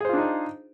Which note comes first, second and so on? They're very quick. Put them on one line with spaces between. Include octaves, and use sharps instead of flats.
G#4 C5 F4 D4 D#4